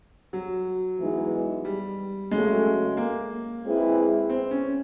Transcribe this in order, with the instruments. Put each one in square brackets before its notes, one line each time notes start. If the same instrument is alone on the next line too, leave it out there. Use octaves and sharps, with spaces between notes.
[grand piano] F#3
[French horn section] G#2 E3 G#3 B3 D#4
[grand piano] G3
[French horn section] C#3 F#3 A3 [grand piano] G#3
[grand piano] A#3
[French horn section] G#3 C4 E4 G#4 B4
[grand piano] C4
C#4